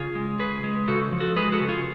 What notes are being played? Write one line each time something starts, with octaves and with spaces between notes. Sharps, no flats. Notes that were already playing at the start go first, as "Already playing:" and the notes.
Already playing: C#3 F4 G#4
G#3
C#3 G#4 B4
G#3
C#3 F#4 A4
F3
F#4 A4
G#3 G#4 B4
F#4 A4
C#3
F4 G#4